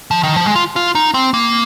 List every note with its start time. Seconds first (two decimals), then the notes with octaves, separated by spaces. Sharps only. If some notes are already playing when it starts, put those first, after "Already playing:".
0.11 F3
0.23 D#3
0.36 F3
0.46 G#3
0.55 F4
0.76 F4
0.95 D#4
1.14 C4
1.34 A#3